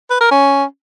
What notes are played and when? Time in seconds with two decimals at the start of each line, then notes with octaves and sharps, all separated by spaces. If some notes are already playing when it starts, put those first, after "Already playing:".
0.10 B4
0.21 A#4
0.31 C#4